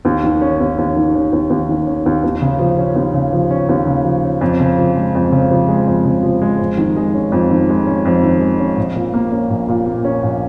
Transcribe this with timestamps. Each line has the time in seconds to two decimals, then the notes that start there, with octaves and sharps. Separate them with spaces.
0.05 D#2
0.24 D#3
0.41 C#4
0.60 D#2
0.78 D#2
0.96 D#3
1.15 C#4
1.33 D#2
1.50 D#2
1.69 D#3
1.87 C#4
2.06 D#2
2.24 D#2
2.42 C#3
2.59 F3
2.78 C#4
2.96 D#2
3.14 C#3
3.33 F3
3.51 C#4
3.69 D#2
3.87 C#3
4.05 F3
4.24 C#4
4.41 F2
4.60 C#3
4.78 F3
4.96 G#3
5.15 F2
5.32 C#3
5.51 F3
5.69 G#3
5.87 F2
6.05 C#3
6.23 F3
6.42 G#3
6.59 F2
6.77 D#3
6.96 G#3
7.14 C#4
7.32 F2
7.50 D#3
7.69 G#3
7.86 C#4
8.05 F2
8.23 D#3
8.41 G#3
8.60 C#4
8.77 A#1
8.95 A#2
9.14 A#3
9.32 C#4
9.50 A#1
9.68 A#2
9.86 A#3
10.04 C#4
10.23 A#1